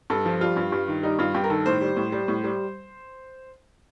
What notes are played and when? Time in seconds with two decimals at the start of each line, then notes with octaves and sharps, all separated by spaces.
0.10 G2 A4
0.26 F3
0.41 G3 F4
0.57 G2
0.72 G2
0.88 D#3
1.03 G3 D#4
1.19 G2 F4
1.34 G2 G4
1.44 A#4
1.50 D#3 A4
1.66 A2 C5
1.81 G3
1.97 A2
2.12 G3
2.28 A2
2.44 G3